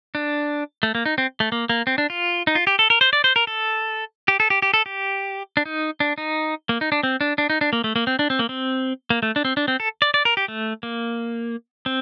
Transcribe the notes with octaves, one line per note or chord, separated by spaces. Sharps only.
D4
A3
A#3
D#4
C4
A3
A#3
A#3
C4
D4
F4
D#4
F4
G4
A4
A#4
C5
D5
C5
A#4
A4
G4
A4
G4
G4
A4
G4
D4
D#4
D4
D#4
A#3
D#4
D4
C4
D4
D4
D#4
D4
A#3
A3
A#3
C4
D4
C4
A#3
C4
A#3
A3
D4
C4
D4
C4
A4
D5
D5
A#4
G4
A3
A#3
C4